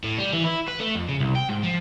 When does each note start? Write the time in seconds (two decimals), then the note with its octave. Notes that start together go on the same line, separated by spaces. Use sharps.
0.04 A2
0.18 G3
0.33 E3
0.45 E4
0.68 B4
0.80 A3
0.95 F2
1.09 C#3
1.20 C2
1.36 G5
1.49 G#2
1.64 F3